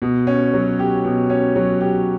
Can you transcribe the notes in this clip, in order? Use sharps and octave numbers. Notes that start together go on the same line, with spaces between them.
B2
C#4
F#3
G4
B2
C#4
F#3
G4